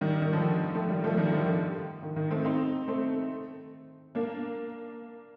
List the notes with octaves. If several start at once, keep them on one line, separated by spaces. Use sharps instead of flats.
D#3 G3
D#3
D3 F3
F3 A3
D#3 G3
F3 A3
D#3 G3
D3 F3
D#3
D#3
D#3
A3 C4
C4 D#4
A3 C4
A#3 D4